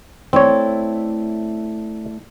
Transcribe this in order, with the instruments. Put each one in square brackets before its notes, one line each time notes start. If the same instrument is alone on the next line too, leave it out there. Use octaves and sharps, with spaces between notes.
[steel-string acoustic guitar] A3 E4 D5 [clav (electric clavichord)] C4 C#5